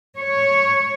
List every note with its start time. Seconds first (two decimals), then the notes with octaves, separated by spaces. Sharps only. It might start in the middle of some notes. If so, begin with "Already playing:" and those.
0.19 C#5